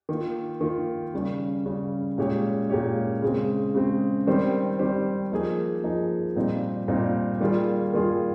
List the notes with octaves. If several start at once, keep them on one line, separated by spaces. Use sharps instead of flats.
D#3 A#3 F4
D#3 A#3 F4
C#3 G3 C#4
C#3 G3 C#4
A#2 G#3 C#4 G4 C#5
A#2 G#3 C#4 G4 C#5
C#3 G#3 C4
C#3 G#3 C4
D#3 G3 C4 G4 C5
D#3 G3 C4 G4 C5
F3 A#3 D#4 G#4
F3 A#3 D#4 G#4
A#2 G3 C4 D#4
A#2 G3 C4 D#4
D#3 G3 A#3 F4 G#4
D#3 G3 A#3 F4 G#4